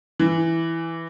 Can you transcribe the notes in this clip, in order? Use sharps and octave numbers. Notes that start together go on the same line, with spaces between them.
E3